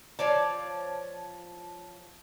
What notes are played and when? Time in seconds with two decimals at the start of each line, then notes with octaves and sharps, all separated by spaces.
0.19 F3 C#5 D5 A5